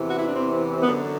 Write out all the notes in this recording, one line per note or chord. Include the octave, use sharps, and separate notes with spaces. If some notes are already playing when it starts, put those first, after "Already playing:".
Already playing: E2 C3 E3
F#4
E4
D4
C4
F#2 D3 B3